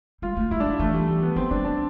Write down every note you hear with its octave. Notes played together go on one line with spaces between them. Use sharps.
G3 F4
A3
G3 E4
D4
F3 E4
E3 A3
G3
A3
B3
F3 C4
G3 D4
D4